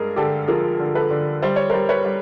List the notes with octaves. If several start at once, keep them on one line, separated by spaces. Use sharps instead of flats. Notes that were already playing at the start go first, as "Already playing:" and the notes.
Already playing: G2 G#3 G#4 A#4
D3 G4 A4
F3 G#4 A#4
D3
A4 B4
D3
G3 C5
C#5
G3 A#4 C5
B4 C#5
G3